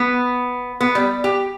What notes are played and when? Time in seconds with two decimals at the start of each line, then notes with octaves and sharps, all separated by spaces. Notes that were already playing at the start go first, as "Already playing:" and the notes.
Already playing: B3
0.81 B3
0.95 G3
1.24 G4